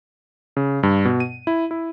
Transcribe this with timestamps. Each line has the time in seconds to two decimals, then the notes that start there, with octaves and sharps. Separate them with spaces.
0.57 C#3
0.83 G2
1.05 B2
1.20 D#7
1.47 E4
1.71 E4